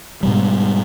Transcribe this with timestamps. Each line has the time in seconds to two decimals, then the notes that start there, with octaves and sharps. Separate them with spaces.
0.23 G#2 B2 G3